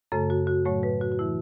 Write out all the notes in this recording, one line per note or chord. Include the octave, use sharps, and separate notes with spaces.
F#2 C#3 A3 A4
F#4
F#4
A2 F#3 A3 C#5
B4
F#4
F#4
E3 A3 E4